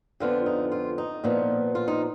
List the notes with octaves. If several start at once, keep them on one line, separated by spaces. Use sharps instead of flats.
F2 D3 F3 B3 F4
D#4
F4
D#4
A#2 F3 B3
F4
D#4